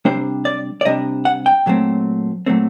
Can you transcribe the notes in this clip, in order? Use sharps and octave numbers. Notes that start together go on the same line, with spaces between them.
C3 G3 D4 C5
D5
D5
C3 G3 D4 D#5
F#5
G5
A#2 F#3 A3 C4
A#2 F#3 A3 C4